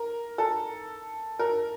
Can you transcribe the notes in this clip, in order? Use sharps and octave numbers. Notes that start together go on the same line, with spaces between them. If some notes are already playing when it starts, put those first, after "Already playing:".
Already playing: A#4
A4
A#4